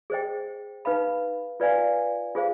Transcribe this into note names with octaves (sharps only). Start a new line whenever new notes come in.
G#4 C5 D#5 G5
D#4 B4 F5 B5
F4 B4 D5 F5 G#5
F4 G#4 C5 F5